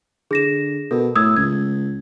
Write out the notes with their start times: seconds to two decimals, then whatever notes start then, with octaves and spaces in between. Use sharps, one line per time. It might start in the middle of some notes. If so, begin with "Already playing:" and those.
0.31 D3 G#4 A#6 E7
0.91 B2 A4 A#4
1.15 A2 D#6 E6 G#6
1.36 C#2 G#6